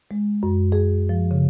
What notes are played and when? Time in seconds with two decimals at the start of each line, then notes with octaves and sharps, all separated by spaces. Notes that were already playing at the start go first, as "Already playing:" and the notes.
0.11 G#3
0.43 F#2
0.72 G#4
1.09 F3
1.31 C#3